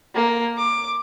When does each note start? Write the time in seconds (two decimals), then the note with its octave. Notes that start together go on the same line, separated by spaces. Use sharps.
0.15 A#3
0.57 D6